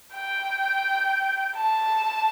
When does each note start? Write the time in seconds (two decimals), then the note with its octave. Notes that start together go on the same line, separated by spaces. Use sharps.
0.14 G5
1.56 A5